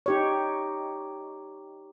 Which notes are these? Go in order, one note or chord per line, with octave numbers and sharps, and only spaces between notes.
D#4 G4 C#5